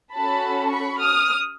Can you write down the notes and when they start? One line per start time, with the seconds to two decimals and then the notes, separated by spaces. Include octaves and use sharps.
0.14 C#4 F#4 A4 A5 B5
0.72 B5 C#6
1.01 D#6 F6